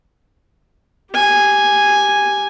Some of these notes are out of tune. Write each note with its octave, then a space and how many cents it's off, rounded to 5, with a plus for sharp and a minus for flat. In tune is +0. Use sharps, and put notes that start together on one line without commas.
G4 +0 G#5 -5